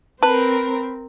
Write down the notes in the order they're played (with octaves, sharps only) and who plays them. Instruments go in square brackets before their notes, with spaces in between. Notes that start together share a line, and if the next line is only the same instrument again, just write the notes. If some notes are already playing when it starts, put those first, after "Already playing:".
[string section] C4 A#4 [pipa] B4 [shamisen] A5